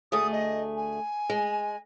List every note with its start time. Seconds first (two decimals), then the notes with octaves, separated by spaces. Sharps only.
0.12 D2 A3 G#4 D#6
0.32 D#5
0.77 G#5
1.30 G#3